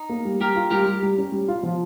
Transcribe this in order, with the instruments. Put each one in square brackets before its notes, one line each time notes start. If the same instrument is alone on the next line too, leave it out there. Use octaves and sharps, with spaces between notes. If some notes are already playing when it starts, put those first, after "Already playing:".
Already playing: [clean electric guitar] D#4
[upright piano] A#3
G3
[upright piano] G3 [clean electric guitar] G4 A#4
[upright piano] F4
[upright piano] G3 [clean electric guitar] G4 A#4
[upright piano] G3
G3
C#4
G3
F4
F3